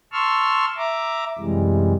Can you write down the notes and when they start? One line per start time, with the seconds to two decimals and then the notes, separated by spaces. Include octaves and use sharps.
0.13 A5 C6 C#6 E6 F6
0.77 E5 A#5 D6
1.39 F#2 C3 E3 G3 G#3